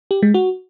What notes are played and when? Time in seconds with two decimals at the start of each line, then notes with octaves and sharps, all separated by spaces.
0.11 G4
0.23 G#3
0.34 F#4